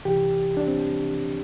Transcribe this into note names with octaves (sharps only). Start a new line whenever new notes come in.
C2 C3 E3 G4
D4
C4